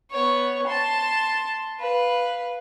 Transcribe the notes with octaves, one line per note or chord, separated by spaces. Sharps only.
B3 C#5
A5 C6
B4 F5